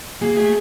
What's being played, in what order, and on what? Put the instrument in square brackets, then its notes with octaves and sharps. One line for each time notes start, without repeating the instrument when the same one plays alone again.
[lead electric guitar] A#3 [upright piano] G#4
[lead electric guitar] A3 [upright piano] G#4